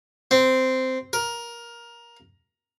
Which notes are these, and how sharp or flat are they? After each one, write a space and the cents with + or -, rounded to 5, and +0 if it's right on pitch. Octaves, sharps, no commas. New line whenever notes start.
C4 -10
A#4 +15